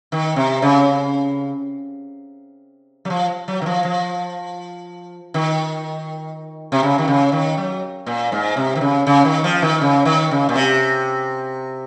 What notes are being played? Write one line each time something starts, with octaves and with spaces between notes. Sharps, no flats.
D#3
C3
C#3
F#3
F3
F#3
D#3
F3
F3
D#3
C3
C#3
D#3
C#3
D#3
F#3
A#2
G#2
C3
D#3
C#3
C#3
D#3
F3
D#3
C#3
D#3
C#3
A#2
C3